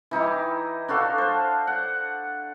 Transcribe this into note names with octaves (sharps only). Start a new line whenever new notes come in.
E3 D#4 E4 G4
D4 F#4 A4 F5
C5 A5
F#5